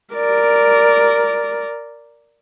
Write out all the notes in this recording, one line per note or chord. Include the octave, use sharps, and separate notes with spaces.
A#4 D5